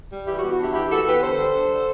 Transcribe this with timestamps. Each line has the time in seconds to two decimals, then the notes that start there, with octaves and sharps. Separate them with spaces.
0.10 G3
0.26 E3 E4 G4
0.38 F#4
0.42 B3
0.50 F#4
0.59 D4 E4 G4
0.74 E3 E4 G4
0.90 E3 F#4 A4
1.06 B3 G4 B4
1.22 D3 A4 C5
1.38 G3
1.54 D4
1.70 D3